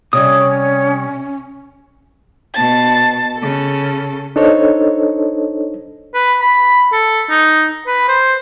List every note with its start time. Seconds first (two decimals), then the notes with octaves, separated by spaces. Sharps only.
0.13 C3 G3 C#4 C#5 D#6
2.54 B2 A5 A6
3.37 C#3 A4
4.36 D4 D#4 A4 C5 C#5 D#5
6.14 B4
6.41 B5
6.92 A4
7.30 D#4
7.87 B4
8.08 C5